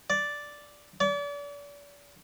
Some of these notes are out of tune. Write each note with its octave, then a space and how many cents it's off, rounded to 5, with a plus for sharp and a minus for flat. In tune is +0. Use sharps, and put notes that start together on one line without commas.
D5 -5
D5 -40